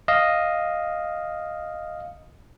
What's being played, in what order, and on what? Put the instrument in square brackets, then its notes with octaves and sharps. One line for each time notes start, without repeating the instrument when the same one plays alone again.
[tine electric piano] D#5 F5